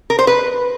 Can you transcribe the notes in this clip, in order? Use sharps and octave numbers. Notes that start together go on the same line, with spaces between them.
A#4
C5
B4